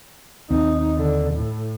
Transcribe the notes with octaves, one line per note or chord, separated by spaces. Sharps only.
D#2 C4 D#4
D3
A2